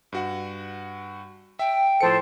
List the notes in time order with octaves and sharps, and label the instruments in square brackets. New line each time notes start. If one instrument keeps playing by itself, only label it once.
[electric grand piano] G2 F#4 F#5
[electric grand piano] E5 [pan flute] G5
[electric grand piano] A2 F3 C#7 [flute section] A4 C5